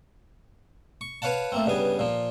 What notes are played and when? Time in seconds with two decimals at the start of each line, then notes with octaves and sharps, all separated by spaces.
1.01 C#6
1.22 B4 C#5 F5 F#5 A5
1.52 A3 A#3 C4
1.66 G2 C#3 B3 G#5
1.99 A#2 F3